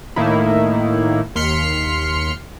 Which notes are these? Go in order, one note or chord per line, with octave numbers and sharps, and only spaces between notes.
A2 D#3 A#3 D#4 E4
D#2 C6 F6 B6 C#7